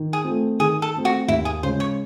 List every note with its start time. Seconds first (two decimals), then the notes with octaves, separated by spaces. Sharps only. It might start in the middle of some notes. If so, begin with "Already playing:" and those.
Already playing: D#3
0.13 G#4
0.25 A3 C4
0.59 D#3 G#4
0.82 A4
0.95 A3 C4
1.05 F#4
1.28 D#2 E4
1.45 G#4
1.63 C#3 C5
1.66 G#3
1.80 C#5